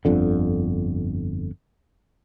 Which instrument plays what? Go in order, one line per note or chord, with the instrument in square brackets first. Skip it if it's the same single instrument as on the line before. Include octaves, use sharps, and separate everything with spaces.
[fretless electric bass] G1 F2 D3